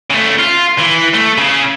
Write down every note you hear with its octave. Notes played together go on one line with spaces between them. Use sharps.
C#3 A3
F4
E3
A3
C#3